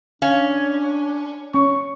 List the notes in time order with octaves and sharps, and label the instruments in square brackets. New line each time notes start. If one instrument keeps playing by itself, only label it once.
[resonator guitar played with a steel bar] C#4 [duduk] D4 [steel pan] F5
[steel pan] C#4 [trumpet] C#6